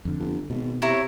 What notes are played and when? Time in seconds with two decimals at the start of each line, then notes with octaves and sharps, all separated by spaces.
0.05 F2 D3
0.19 G1
0.50 G#1 B2
0.82 C3 E4 C#5 A#5